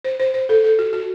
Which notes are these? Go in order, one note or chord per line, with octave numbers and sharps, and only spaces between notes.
C5
C5
C5
A4
A4
F#4
F#4